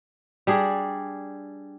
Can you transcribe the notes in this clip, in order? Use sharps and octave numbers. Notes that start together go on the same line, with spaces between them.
G3 D4 G#4